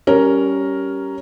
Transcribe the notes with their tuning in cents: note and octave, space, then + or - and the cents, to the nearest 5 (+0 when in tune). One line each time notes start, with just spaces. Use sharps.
G3 -15 C#4 +5 A#4 +0